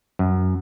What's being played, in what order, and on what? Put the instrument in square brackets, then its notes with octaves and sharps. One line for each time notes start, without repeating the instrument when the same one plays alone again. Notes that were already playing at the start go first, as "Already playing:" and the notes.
[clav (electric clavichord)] F#2